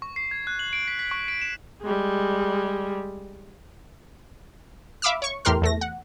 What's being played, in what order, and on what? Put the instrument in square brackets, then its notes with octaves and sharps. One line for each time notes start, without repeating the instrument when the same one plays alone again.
[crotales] C#6
C7
G#6
F#6
F#7
D7
B6
B6
C#6
D7
E7
[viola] G3 G#3
[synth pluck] E5 F5 B5 D6 E6 F6
C#5 C#6
E2 A2 G4 A#4 C6 F6
E2 A3 A#6
F#5